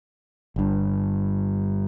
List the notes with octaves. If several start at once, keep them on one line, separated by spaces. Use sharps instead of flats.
G1 G2